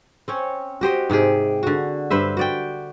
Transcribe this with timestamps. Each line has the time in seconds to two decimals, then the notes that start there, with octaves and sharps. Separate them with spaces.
0.28 C4 C#4 C#5
0.81 F#4 G4 C5 D#5
1.10 G#2 C3 G4 G#4
1.63 D3 F#4
2.10 G2 B4 C5 E5
2.37 F#4 D5 G5